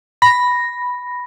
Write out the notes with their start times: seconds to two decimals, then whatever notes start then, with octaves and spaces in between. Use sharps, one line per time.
0.22 B5 A#6